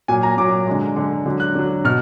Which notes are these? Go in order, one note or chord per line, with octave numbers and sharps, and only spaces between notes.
A#2 F#3 G#5
A#5
A#2 F#3 D6
D3 G#3
D3 G#3
D3 F#3
F#6
D3 F#3
B2 F6